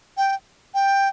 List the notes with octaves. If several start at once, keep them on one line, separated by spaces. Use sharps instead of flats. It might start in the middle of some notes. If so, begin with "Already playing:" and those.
G5
G5